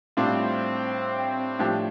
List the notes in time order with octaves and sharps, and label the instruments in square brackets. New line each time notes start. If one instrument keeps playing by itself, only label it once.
[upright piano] A2 G3 D4 F4 [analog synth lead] C4
[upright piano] A2 F3 D4 G4